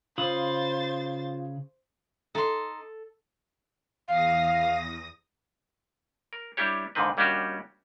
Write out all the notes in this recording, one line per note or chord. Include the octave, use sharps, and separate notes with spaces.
C#3 F4 C5 B5 D#6 A6
D#4 A4 C6
E2 F5 D#6 A#6
A#4
G3 D4 E4 G4 C#5
F2 G#2 D3 D#3 C4 B4
D#2 G3 C#4 D4 F#4 G4